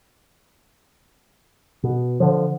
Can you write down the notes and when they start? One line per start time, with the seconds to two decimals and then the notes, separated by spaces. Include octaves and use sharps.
1.83 B2
2.20 D3 F3